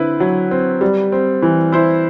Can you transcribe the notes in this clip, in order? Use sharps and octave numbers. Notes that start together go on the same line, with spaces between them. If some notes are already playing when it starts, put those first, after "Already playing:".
Already playing: D3 C4 E4 B4
F#3
C4
G3
C4
E3
E4 C5